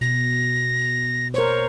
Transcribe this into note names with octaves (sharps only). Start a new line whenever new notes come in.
B2 A#6
A#4 C5 C#5